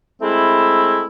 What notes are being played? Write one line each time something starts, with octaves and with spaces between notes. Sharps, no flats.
G#3 A3 C4 E4